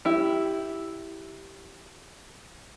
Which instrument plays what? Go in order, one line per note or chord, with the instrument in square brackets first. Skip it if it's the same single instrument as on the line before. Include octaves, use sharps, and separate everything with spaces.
[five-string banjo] E4 G4